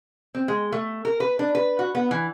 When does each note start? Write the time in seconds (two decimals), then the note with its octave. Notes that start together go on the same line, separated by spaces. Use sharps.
0.35 C4
0.48 G#3
0.72 A3
1.05 A#4
1.20 B4
1.39 D4
1.55 B4
1.79 F#4
1.95 B3
2.11 E3